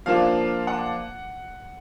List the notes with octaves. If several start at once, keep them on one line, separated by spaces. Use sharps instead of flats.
F3 A#3 D4 F4 F5
F#5